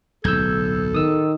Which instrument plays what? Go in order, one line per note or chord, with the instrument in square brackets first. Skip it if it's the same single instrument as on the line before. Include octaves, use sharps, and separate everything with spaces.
[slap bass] D1 B1 [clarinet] A4 [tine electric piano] E6 G6 G#6
[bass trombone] D#3 [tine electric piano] D#6 E6